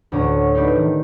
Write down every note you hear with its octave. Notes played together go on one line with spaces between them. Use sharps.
D2 A2 F#4 C#5 D5
D#4 G4 B4 D5
D#3